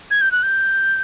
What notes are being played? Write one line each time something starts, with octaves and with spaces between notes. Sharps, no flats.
G#6
G6
F#6
G6